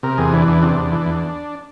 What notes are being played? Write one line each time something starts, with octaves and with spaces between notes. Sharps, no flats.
C3 A#4
E2 G#4
E3 D4
E2 D4
C3 D4
E2
E3
E2